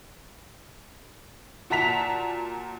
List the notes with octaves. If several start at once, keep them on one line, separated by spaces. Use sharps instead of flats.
A#2 F#4 A5 A#5 B6 F7